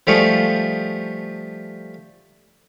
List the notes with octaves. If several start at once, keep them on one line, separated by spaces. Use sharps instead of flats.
F3 G3 A3 F4 G#4 C#6